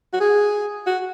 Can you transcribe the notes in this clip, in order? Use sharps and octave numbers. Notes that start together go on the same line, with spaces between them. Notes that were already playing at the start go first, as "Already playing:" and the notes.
F#4
G#4
F#4